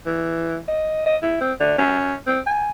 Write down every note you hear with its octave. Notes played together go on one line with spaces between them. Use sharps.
E3
D#5
D#5
E4
C4
D3
C#4
C4
G#5